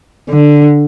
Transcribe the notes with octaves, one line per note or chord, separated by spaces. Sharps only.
D3